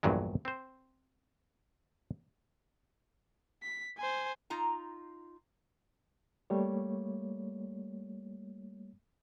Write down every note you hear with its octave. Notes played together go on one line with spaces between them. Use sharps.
A#1 E2 G2 F#3 G#3
C4 C5
B6
C5 G#5
D#4 F4 A#5
G3 A3 A#3 C#5